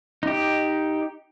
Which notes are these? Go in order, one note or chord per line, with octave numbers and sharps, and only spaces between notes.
D#4 G4